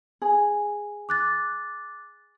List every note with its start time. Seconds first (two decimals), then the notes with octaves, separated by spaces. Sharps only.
0.22 G#4
1.09 D6 F#6 A6